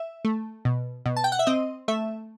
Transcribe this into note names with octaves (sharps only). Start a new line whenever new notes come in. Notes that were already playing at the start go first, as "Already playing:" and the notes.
Already playing: E5
A3
B2
B2
A5
G5
F#5
E5
C4 D#5
A3 E5